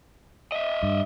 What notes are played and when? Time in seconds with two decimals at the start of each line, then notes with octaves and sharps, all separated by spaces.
0.52 D#5 E5
0.83 G2